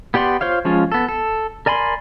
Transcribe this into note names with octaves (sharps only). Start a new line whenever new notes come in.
B3 G4 D5 F#5 C6
F4 C5 C#5 F5
F3 G#3 C#4 F4
B3 A4
A4
A#4 D5 G#5 B5 C6